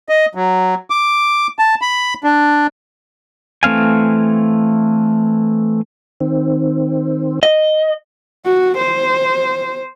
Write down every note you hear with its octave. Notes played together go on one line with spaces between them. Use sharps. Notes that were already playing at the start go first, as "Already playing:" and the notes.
D#5
F#3
D6
A5
B5
D4
E3 A3 C4 F5 G#5
D#3 C4
D#5
F#4
C5